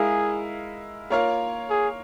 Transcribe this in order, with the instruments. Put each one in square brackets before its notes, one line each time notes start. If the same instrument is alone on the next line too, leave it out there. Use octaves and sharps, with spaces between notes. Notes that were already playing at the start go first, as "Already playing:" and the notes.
Already playing: [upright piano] G#3 E4 A#4 F5 [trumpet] G#4
[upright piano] A#3 F4 A#4 C#5 F5
[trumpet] G#4